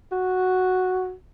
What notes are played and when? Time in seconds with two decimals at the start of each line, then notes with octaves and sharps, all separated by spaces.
0.12 F#4